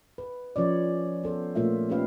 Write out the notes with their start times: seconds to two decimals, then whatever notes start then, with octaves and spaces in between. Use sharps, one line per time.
0.18 B4
0.56 F3 C#4 C#5 D5
1.24 B3 A4 C5
1.55 A#2 A3 A#3 F4 C#5 E5
1.89 C#4 D#4 F4 G4 B4 F5